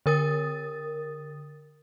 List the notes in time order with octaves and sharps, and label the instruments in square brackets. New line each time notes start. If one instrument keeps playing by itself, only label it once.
[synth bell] D3 A#4 D#6 A6